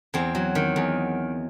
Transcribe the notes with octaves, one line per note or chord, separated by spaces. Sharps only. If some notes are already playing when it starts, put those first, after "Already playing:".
E2 C4
F#3
D#3
E2